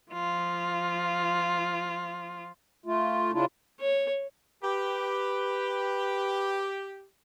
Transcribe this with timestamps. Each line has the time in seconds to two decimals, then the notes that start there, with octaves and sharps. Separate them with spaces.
0.12 F3 F4
2.86 A3 F4
3.33 C#3 D4 E4 F4
3.80 C#5
4.63 G4 B4